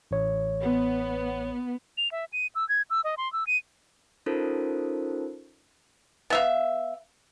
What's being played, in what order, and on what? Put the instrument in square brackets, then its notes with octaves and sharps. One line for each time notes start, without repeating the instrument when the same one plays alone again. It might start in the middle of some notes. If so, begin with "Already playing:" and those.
[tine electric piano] A1 C#5
[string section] B3
[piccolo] F7
E5
D#7
E6
G#6
E6
D#5
C6
E6
D#7
[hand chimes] C#4 D#4 F4 A4 A#4 C5
[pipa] B3 E5 F5